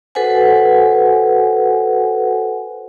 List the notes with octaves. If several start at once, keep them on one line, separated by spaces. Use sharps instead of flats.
F#4 A4 B4 C5 F#5 G#5